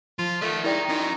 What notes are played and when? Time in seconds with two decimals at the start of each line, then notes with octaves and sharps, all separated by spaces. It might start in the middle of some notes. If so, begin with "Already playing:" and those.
0.19 F3 F4
0.42 D#3 A3 D5 E5
0.64 G#2 D#4 E4 A#4 D5 G5
0.89 D#3 C#4 F#4